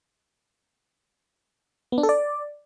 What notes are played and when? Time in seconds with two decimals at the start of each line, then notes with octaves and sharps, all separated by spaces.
1.92 B3
1.98 D4
2.03 A4
2.09 D5